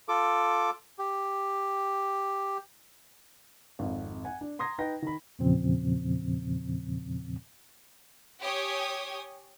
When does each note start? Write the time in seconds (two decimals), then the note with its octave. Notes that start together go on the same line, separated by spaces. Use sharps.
0.09 F4 A4 D6
0.99 G4
3.79 G#1 F2 F#5
4.25 F#5 G#5
4.41 D4
4.59 A#5 C6 D#6 G#6 A#6
4.78 D#4 B4 G5 A#6
5.02 D#3 B5
5.39 E2 A#2 C#3 F3 C4
8.40 G4 C#5 G5 G#5 D#6 G#6